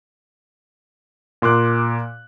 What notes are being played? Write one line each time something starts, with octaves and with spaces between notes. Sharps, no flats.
A#2 C6 D6 F#6